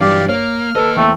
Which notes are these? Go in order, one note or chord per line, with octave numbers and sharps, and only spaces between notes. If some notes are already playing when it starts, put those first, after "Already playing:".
G2 E3 F#3 G4 D5 F5
A#3 C#5 F6
A#3 A4 B4 D#5
E2 A3 C4